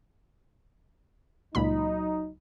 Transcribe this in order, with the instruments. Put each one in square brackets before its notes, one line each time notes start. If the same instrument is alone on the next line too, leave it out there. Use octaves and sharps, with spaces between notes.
[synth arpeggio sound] C#2 A#2 B5 [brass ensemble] F#3 D#4